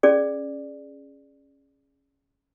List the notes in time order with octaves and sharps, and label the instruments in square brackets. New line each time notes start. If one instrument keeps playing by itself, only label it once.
[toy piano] C#4 G#4 D5